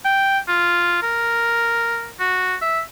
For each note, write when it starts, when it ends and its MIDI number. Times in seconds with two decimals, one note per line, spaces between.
0.05 0.39 79
0.48 1.02 65
1.02 2.09 70
2.19 2.55 66
2.61 2.81 76